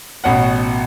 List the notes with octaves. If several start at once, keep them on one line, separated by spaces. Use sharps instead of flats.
A1 B2 C#4 F#5